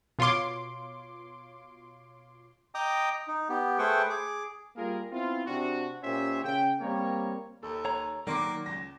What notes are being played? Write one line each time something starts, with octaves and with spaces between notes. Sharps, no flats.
B2 F4 C#5 C6 D6
D#5 G5 A#5 D6 D#6
D#4
B3 G4
A3 G#4 B4 C5 G5 C#6
G#4 D6
G3 A#3 F4 G#4 A#4
B3 C4 E4 F4
C3 C4 D4 F#4
A#2 C#4 G4 C5 C#5 E5
C#3 G5
G3 A#3 C4 A#4 C#5
D#2 A4
C#5 A#5
D#3 F#3 A#3 D5 C6 D6
C#2 A#6